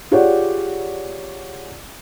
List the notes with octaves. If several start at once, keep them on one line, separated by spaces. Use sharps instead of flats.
F4 G4 G#4 C#5 D5 F#5